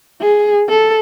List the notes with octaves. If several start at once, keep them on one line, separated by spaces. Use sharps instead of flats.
G#4
A4